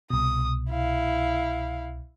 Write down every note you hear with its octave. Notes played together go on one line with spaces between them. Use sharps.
C2 B2 D#6
E4 F5